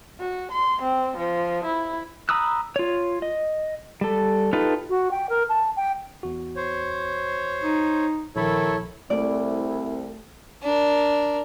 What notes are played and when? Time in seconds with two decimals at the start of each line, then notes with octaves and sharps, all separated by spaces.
0.20 F#4
0.51 C6
0.82 C4
1.18 F3
1.65 E4
2.29 A#5 B5 D#6 E6 F#6
2.76 F4 C#5
3.22 D#5
4.01 G3 A4
4.53 D#4 F4 G4 A4 B4
4.89 F#4
5.11 G5
5.29 A#4
5.49 A5
5.76 G5
6.23 E2 F#4
6.56 C5 C#5
7.63 D#4
8.36 A#1 D#3 E4 A4 C#5 B5
9.10 C2 A3 C4 E4 D5
10.63 D4 A#4